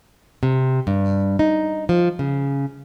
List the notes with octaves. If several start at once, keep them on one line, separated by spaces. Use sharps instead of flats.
C3
G2
D#4
F3
C#3